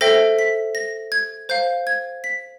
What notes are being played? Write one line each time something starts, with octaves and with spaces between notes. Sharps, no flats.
A4 C5 E5 G5 A#6
B6
A#6
G#6
C5 F5 G6
G#6
B6